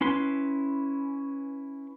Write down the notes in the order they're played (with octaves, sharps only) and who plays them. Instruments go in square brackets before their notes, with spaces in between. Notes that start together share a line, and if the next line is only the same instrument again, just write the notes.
[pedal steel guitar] C#4 E4 B4 C6